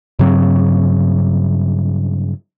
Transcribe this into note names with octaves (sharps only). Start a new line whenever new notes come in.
G2 C#3 F#3 C4